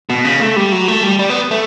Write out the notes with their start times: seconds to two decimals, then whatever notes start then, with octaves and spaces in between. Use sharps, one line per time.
0.10 B2
0.25 C#3
0.40 A3
0.56 G3
0.72 F#3
0.88 A3
1.03 G3
1.19 G3
1.30 B3
1.51 A3